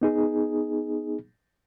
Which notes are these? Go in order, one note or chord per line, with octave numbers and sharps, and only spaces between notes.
B3 D#4 G#4